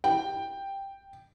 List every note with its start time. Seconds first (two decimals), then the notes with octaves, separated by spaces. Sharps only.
0.04 G5